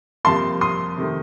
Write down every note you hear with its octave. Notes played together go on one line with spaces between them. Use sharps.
F2 C3 G3 A#3 A5 C6
C6 D#6
C3 D#3 A3